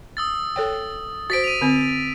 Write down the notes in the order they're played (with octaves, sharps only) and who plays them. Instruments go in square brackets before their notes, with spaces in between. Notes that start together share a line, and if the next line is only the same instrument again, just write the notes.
[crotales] D#6 E6 A6
[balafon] A4 C#5 G5
[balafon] F#4 C5 [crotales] A6 B6 D7
[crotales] D#7 F7
[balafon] D3 C4